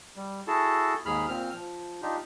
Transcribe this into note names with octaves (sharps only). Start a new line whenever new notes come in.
G3
E4 F#4 G#4 A4 A5
D#2 G#2 G#4 B5 F6
A#2 C4 F6
F3
D4 D#4 F4 G4